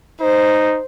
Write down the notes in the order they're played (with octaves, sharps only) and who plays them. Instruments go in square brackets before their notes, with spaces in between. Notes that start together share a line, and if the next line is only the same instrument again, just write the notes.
[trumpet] D#4 [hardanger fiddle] C5